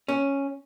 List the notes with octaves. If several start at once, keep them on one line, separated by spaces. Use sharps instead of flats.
C#4